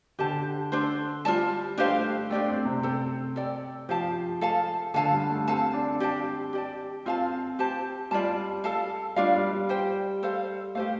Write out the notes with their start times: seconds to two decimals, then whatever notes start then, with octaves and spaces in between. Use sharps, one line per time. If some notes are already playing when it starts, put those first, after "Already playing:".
0.19 D3 G4 C5 A5
0.72 D4 A4 C5
1.25 G3 F4 A4 D5 A5
1.78 A3 D4 G4 C5 F5
2.30 A3 D4 G4 D5 G5
2.48 C4
2.65 C3
2.83 A4 C5 G5
3.36 A4 D5 G5
3.89 F3 G4 F5 A5
4.41 A4 F5 A5
4.94 D3 A4 F5 A5
5.12 G3
5.30 A3
5.47 C4 A4 F5 A5
5.73 D4
6.00 G4 D5 F5 A5
6.53 G4 D5 A5
7.05 C4 F4 A4 F5 A5
7.59 G4 C5 A5
8.11 G3 F4 D5 F5 A5
8.64 A4 F5 A5
9.16 G3 D4 F4 D5 F5
9.34 G3
9.52 G3
9.69 G4 C5 G5
10.23 A4 C5 F5
10.75 A3 G4 C5 F5